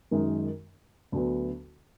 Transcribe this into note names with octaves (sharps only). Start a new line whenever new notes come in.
F#2 D#3 G#3 D#4 A#4
D2 D3 F#3 B3